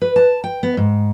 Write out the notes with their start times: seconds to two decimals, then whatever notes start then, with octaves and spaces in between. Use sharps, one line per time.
0.02 B4
0.16 A5
0.44 G5
0.63 B3
0.77 G#2